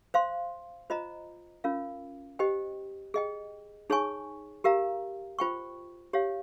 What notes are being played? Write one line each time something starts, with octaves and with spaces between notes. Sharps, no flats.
C5 F5 C6
F4 C5 D#5 A#5
C#4 F4 A#4 F5
G4 C5 D#5 G5
G#4 D#5 G5
D#4 G#4 C#5 G#5 C#6
G4 A#4 F5 A#5
F4 C5 G5 C#6
G4 C#5 F5